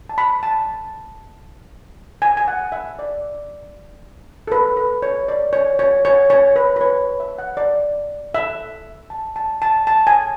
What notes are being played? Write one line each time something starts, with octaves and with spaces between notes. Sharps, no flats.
A5
B5
A5
G#5
G#5
F#5
E5
D5
A4
B4
B4
C#5
D5
C#5
C#5
C#5
C#5
B4
B4
C#5
E5
F#5
D5
E5
A5
A5
A5
A5
G#5